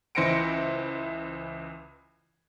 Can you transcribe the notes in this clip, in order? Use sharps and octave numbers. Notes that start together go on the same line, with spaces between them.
C#2 E3 C5 A#6 C#7 D7